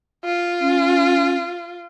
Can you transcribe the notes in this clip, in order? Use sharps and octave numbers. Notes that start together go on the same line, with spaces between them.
F4
C#4